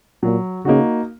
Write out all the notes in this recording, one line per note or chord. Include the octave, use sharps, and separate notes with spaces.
A#2 F#3
C#3 A#3 D#4 F#4